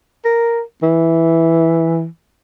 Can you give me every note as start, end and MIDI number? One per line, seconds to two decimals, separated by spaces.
0.25 0.61 70
0.83 2.06 52